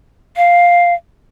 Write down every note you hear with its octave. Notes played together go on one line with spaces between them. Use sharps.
F5